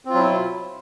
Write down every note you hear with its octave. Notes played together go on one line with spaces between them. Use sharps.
B2 F#3 C4 E4 F4